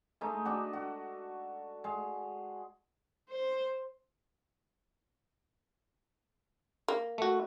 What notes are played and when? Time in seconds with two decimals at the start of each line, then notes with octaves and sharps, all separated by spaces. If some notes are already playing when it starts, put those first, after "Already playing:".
0.21 G#3 A3 D#4
0.45 D4 F#4
0.73 F#4
1.84 G#3
3.29 C5
6.88 A#3
7.18 A3 F#4